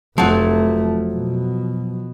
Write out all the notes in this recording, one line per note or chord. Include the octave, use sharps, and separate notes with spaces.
F1 F3 F#3 A3
B2